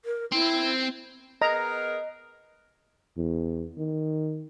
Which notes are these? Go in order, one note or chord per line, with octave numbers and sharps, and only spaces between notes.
A#4
C4 E4
B3 G#4 A#4 D#5 A#5
E2
D#3